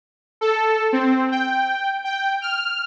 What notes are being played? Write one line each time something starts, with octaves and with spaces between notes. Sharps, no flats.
A4
C4
G5
G5
F6